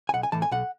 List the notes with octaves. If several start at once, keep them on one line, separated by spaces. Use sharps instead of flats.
G#5
B1 F#5
G#5
A2 E3 A5
G#5
B1 F#5